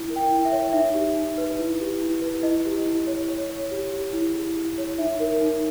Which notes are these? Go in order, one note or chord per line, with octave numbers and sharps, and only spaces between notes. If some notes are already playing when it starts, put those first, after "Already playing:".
Already playing: E4
A#4
G5
E4
E5
C#5
D#4 E5
G4
D#4
B4
E4
G4
E4
B4
E4 D#5
G4
E4
C#5
C#5
C#5
G4
G4
E4
G#4
E4
C#5
D#4 E5
A#4
D#4